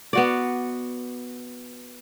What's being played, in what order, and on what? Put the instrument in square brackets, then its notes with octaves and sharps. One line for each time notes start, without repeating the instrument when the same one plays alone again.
[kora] B3 F#4 D5